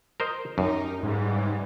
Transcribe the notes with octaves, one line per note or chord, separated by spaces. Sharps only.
A#4 C5 D#5
F#2 D#4 G4 A#4
G#2 C#3 E3 G3